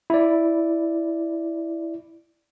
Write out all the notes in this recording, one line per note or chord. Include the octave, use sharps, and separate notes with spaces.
E4 D5